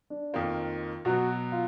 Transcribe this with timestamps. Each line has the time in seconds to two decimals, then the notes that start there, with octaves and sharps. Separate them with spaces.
0.10 D4
0.33 F2 D#3 A#3 F4
1.05 B2 F#3 B3 F#4
1.52 F4